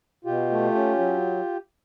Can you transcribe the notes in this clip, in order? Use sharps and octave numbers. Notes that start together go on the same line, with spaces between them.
B2 F4 G4
A3
C#4
F#3